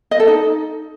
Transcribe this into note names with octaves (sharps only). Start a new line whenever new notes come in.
D#5
A4
D#4